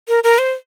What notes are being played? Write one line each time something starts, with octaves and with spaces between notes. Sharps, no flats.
A#4
A#4
C5